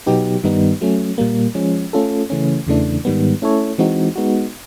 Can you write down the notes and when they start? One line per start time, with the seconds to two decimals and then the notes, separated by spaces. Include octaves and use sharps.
0.06 B2 F#3 B3 D#4 G4
0.44 G2 D#3 G3 B3 D#4
0.81 F#3 A3 C#4
1.18 A#2 G3 A#3
1.55 F3 G#3 C#4
1.93 A3 C#4 F4 A4
2.30 C#3 E3 A3 C#4
2.67 E2 C#3 E3 A3 D4
3.05 G#2 D#3 G3 B3
3.42 A3 C#4 E4 A4 C#5
3.78 E3 G#3 C4 D#4 F#4
4.15 G#3 B3 D#4 F#4